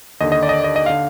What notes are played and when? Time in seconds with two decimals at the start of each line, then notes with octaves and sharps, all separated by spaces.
0.21 D#2 D3 D#5
0.32 D#5
0.43 D5
0.49 D#5
0.53 D5
0.64 D#5
0.76 D#5
0.86 D3 F5